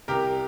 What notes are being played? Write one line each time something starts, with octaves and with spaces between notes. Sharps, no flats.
C2 G4 A#4